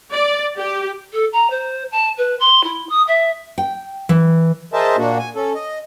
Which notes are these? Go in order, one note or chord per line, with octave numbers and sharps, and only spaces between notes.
D5
G4
A4
A#5
C5
A5
B4
C6
E4
D#6
E5
G5
E3
G#4 A#4 C5 D#5 E5 A5
A#2 A#3 D4 F#4
G#5
C#4 A4
D#5